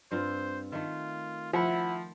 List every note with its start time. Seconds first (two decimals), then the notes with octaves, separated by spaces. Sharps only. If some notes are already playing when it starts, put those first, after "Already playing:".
0.11 G2 C4 F4 C5
0.72 D#3 A3 F4
1.53 F3 E4 E5 F#5 B5